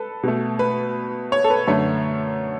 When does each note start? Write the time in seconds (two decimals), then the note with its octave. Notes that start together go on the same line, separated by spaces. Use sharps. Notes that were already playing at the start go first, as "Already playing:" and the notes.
Already playing: A4 B4
0.23 B2 A3
0.59 B4
1.32 C#5
1.44 A4
1.50 B4
1.67 F#2 D3 A3 C#5